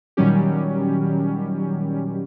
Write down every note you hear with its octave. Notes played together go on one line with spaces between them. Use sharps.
A#2 D#3 F#3 G3 C#4 G4